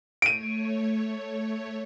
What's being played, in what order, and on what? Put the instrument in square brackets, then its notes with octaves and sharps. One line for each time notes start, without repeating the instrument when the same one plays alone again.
[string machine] A3 C#5 [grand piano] D7 D#7